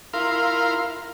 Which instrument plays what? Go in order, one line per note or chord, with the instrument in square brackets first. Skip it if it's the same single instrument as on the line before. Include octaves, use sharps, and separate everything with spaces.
[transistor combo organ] E4 F4 A#4 F5 C6